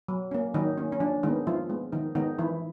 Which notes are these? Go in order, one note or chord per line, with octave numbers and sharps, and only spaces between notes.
F#3
A#3 C#4
D#3 F#3 D#4
A#3 C#4
C#4
F3 D4
D#3 G#3 B3 D#4
F3 F4
G#3 B3
D#3 F3 D#4
D#3 G#3 B3 D#4
E3 F3 E4